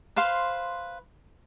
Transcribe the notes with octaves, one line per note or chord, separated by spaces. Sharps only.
B4 C5 F5 C6